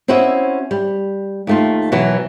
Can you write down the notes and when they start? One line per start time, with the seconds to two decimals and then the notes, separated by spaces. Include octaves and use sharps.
0.08 C4 C#4 E4 F#4 D#5 E5
0.71 G3
1.47 D#2 A3 F4
1.92 B2 E3 F#3 B3